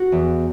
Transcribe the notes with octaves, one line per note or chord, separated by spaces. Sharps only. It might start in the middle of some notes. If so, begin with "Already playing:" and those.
Already playing: F#4
E2